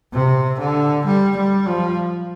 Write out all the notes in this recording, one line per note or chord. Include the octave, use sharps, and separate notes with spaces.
C3
D3
G3
G3
F3